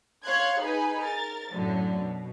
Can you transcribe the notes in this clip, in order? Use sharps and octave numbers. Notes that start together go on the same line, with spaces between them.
C#5 F5 C6 F#6 G#6
D#4 G#4 B4 G#5 B5
A#4 A6
F#2 A2 D3 F#3
B2